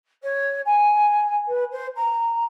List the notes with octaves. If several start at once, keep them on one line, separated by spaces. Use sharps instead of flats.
C#5
G#5
B4
C5
A#5